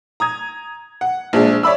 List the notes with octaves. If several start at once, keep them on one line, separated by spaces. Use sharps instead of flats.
A#5 D#6 G#6
F#5
A#1 F3 G#3 D4
C#5 D5 E5 B5 E6